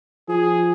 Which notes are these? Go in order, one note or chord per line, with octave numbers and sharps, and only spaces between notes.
F3 G#4